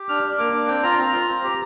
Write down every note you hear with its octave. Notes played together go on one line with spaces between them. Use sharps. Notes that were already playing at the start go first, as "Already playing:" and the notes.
Already playing: G4
D4 F6
D4
A#3 D6
D4
C4 G5
F4 A#5
C4 A#5
F4
C4
G4